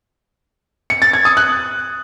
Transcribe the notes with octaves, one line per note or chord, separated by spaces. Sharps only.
C#7
A6
G#6
D#6
F#6